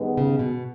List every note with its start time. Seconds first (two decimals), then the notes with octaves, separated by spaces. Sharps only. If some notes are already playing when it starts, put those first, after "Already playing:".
Already playing: G2 D#3 G#3 B3
0.17 C#3
0.39 B2